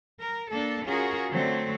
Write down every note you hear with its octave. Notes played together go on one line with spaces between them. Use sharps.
A#4
A#3 D4 A4
C#4 F4 F#4 G#4 A#4
D3 F#3 A3 C4